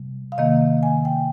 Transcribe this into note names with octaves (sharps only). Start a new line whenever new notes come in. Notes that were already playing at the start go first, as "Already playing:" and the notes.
Already playing: C3 G3
F5
C3 D#3 A#3 D#5
G#5
G5